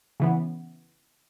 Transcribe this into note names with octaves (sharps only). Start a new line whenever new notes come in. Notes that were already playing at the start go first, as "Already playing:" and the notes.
C#3 E3 B3